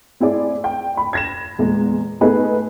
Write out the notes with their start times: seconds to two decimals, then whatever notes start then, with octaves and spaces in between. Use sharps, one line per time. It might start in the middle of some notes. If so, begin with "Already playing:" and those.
0.20 C4 E4 G#4 D5
0.64 G5
0.97 B5
1.13 G#6 A#6 E7
1.59 E2 A#2 G#3
2.21 A3 B3 D#4 G#4 B4